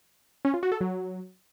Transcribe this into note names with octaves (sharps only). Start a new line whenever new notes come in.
C#4
F4
F#4
A4
F#3